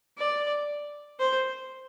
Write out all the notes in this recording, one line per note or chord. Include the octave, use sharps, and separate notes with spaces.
D5
C5